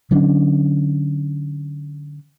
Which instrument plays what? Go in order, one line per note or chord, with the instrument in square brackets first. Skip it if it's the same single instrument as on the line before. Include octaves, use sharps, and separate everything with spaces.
[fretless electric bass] D3 F#3 C#4 D4